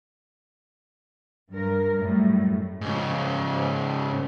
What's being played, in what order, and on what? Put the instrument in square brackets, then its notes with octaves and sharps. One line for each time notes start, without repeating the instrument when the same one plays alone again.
[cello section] G2 A#4
F#2 A2 G3
[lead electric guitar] G#2 C#3